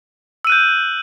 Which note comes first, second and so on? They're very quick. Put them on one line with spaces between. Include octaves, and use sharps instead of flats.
E6 D#7 F#6 G6